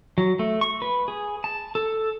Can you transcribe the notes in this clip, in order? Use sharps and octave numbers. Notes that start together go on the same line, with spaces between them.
F#3
A3
C#6
B4
G#4
A5
A4